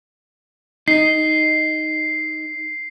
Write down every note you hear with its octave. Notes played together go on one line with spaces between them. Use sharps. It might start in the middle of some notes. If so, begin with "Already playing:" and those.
D#4 C7